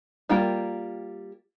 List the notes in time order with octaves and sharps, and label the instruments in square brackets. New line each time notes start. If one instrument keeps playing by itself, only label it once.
[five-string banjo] G3 A#3 F4 A#4 G5